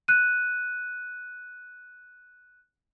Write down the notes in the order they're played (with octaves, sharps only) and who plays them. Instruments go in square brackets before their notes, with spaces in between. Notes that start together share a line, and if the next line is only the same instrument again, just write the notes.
[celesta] F#6 D#7